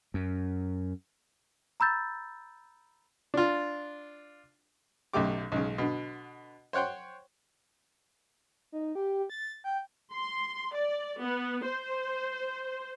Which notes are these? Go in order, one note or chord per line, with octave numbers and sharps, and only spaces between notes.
F#2
A#5 B5 E6 G6 A6
D4 F4
B1 F#2 A3 G4 D6
B1 G#2 C#3
B2 D3
C5 C#5 F#5 G5 C6
D#4
G4
A6
G5
C6
D5
B3
C5